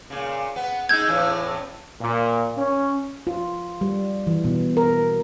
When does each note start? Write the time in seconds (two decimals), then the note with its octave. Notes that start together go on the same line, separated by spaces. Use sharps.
0.10 A#2 C#3
0.56 B3 F#5
0.89 G#3 D#4 E6 G6 G#6
1.08 E2 A2 C#4
2.01 A#2
2.56 C#4
3.27 F4
3.81 G3
4.27 E3
4.45 B2
4.77 A#4